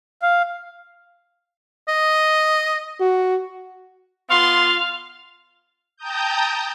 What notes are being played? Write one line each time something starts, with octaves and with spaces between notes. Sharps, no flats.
F5
D#5
F#4
B3 F4 F5 C6
G5 A5 A#5 D#6 G6